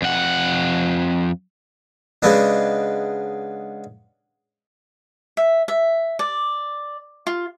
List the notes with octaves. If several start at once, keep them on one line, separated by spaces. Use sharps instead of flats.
F2 F#5
C#3 G#3 B3 D4
E5
E5
D5
F4